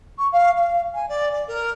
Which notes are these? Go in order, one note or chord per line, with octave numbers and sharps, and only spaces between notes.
C#6
F5
F5
G#5
D5
D5
A#4